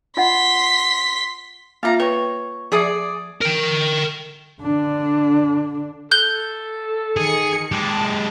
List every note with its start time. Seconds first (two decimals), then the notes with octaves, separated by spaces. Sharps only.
0.17 F4 D#5 F#5 C6 B6
1.83 A#3 F4 E5 F5 A#5
2.00 B4 C#5 G5
2.72 F3 G#4 D5 E5 D#6
3.41 A#4 G5
4.62 D3 D4
6.11 A4 F#6 G6 G7
7.17 D#3 G#4 C#7
7.72 G#3 G4 A5